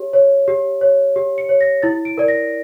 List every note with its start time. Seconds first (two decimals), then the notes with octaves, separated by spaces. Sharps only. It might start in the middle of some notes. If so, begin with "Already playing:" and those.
Already playing: G4 C#5
0.13 C#5
0.48 G4
0.81 C#5
1.16 G4
1.38 C#7
1.49 C#5
1.61 A#6
1.82 E4 A6
2.05 D7
2.18 A#4 D5
2.28 A#6